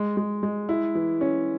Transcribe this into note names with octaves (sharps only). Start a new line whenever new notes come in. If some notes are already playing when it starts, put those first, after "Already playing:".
Already playing: G#3
G#3
G#3
E4
E3
C#4